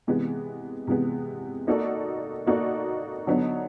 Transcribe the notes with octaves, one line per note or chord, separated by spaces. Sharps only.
C3 E3 G#3 B3
C3 E3 G#3 B3
A#3 D#4 F#4 A4 D5
A#3 D#4 F#4 A4 D5
D3 F#3 B3 D#4